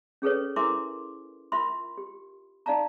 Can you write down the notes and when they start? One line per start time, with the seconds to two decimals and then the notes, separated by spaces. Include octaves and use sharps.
0.22 C#4 G#4 A4 B4 C#5
0.56 E4 A#4 E5 G#5 C6 D6
1.52 F4 A#4 E5 B5 C6
1.98 G4
2.66 D#4 D5 F5 A5 A#5